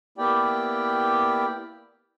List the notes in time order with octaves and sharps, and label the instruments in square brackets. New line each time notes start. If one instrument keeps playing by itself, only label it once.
[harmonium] A#3 B3 E4 G4 D5 G5